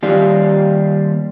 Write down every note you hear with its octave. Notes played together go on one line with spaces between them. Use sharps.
D#2 G3 F4